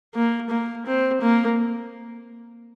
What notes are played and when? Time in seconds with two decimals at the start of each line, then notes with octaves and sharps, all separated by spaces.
0.15 A#3
0.50 A#3
0.86 C4
1.21 A#3